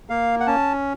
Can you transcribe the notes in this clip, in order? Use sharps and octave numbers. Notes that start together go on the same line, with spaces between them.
A#3 F5
F#5
C#4 A5